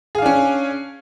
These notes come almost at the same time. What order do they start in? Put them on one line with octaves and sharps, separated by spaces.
G#4 F5 D4 C#4